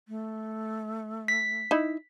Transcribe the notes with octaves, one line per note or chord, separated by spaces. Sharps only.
A3
B6
D#4 E4